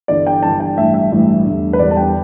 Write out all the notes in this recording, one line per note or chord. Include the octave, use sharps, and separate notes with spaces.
G1 G2 E3 D5
G5
G1 G2 E3 A5
G5
A1 G2 E3 E5
E5
A1 G2 E3
E2 D3 G3
B4
E2 D3 G3 D5
A5
G5